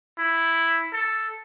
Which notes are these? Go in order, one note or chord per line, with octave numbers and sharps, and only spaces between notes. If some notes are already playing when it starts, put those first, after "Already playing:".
E4
A4